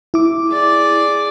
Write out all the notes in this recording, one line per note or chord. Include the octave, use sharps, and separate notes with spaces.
E4 D6
G#4 D5